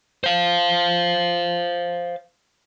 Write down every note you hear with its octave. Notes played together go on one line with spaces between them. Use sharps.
C5 F5